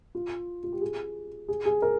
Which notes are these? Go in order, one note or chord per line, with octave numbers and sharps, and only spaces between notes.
F4
F4
G4
G#4
G#4
G#4
A#4